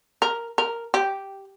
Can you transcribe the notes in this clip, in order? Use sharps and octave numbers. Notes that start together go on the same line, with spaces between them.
A#4
A#4
G4